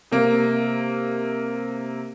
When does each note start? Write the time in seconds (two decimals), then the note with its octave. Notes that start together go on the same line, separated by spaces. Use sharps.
0.12 C3 A#3